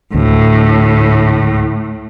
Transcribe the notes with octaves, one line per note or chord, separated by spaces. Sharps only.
D2 A2